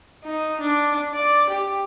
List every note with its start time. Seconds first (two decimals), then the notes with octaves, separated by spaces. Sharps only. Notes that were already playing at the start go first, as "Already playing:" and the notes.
0.24 D#4
0.60 D4
1.14 D5
1.50 G4